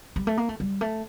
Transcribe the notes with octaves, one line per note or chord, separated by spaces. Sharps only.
G3
A3
A#3
A3
G3
A3